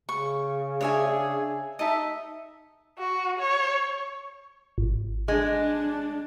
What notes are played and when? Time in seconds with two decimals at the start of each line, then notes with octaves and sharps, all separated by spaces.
0.09 C#3 C#6
0.81 D4 G#4 C#5 E5 G#5
1.79 D#4 A4 D#5 E5
2.99 F#4
3.40 C#5
4.78 G#1
5.28 G#3 D4